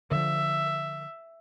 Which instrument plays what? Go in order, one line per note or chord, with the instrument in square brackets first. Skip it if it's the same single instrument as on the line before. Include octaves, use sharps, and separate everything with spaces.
[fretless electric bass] D3 F3 [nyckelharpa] E5